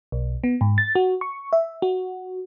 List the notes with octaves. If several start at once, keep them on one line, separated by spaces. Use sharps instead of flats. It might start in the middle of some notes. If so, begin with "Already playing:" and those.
B1
B3
G#2
A6
F#4
C#6
E5
F#4